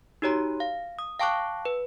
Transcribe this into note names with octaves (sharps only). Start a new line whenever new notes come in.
D#4 F#4 G4 C#5 A#5
F5
D#6
F5 G5 A5 C#6 D6 F#6
B4